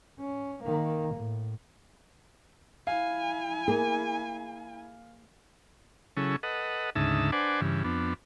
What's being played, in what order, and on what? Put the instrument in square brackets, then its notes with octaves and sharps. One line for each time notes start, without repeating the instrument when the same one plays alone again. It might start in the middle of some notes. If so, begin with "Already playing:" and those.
[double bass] C#4
D#3 A#3
A2
[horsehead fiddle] E4 G#5 [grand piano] F5
[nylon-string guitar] A#3 G#4
[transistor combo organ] C#3 F#3 C#4 E4 G#4 A4
A4 B4 D#5 F#5
D2 G#2 C#3 D#4 E5 A5
D4 B4 C5 D5 F#5 G#5
G2 C#3 E3
F2 B3 D4